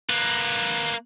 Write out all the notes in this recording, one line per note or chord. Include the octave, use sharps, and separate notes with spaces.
A#3 B4